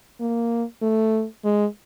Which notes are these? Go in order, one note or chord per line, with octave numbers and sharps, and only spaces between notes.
A#3
A3
G#3